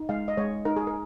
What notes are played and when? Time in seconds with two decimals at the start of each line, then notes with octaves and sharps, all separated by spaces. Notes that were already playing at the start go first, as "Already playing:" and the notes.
Already playing: D#4
0.09 G#3 F5
0.28 D#5
0.37 G#3 C#5
0.65 D#4 A#4
0.76 G#4
0.87 A#4